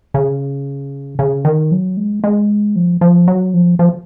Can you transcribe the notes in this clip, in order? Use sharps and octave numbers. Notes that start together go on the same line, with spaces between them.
C#3
C#3
D#3
F#3
G#3
G#3
F3
F3
F#3
F3
F3